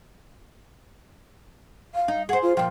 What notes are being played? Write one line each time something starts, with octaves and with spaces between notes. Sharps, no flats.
F5
D#4
G#4 C5 F#5
F4
A#2 F3 G5